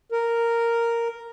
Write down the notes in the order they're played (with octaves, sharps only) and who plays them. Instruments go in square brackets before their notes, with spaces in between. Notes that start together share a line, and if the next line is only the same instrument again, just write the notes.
[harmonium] A#4